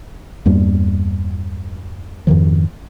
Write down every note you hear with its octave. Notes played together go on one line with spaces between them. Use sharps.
E2 G2 G3 A#3
F2 G#2 D#3 F3